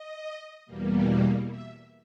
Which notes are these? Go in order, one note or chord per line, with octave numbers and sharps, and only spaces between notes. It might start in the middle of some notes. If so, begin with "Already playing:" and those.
Already playing: D#5
E2 B2 G3 A#3
E5